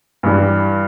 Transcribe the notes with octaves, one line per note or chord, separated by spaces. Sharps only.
G2 E3 G3